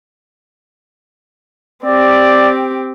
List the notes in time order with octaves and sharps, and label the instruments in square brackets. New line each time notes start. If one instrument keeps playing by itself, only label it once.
[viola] C4 G4 [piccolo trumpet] D5